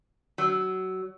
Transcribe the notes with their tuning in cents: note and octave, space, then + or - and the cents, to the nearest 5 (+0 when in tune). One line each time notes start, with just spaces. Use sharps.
F#3 +20